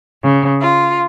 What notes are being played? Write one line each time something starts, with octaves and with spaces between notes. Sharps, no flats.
C#3
F4